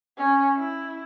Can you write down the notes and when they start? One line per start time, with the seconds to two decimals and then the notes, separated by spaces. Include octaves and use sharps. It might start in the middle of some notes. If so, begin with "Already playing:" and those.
0.18 C#4
0.57 E4